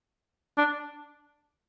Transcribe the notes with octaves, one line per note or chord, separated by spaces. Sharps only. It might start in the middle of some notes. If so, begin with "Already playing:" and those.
D4